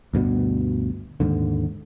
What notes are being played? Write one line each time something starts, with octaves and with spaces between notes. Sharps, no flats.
D2 G2 B2
D#2 G#2 D3